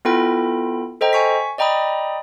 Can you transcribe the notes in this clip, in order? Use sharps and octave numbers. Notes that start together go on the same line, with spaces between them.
B3 E4 F4 A4 G5 B5
A4 C5 D#5 G5 A#5
G#5 C#6 B6
D5 D#5 G5 A#5 B5 D#6